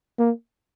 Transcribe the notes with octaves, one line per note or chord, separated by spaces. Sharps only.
A#3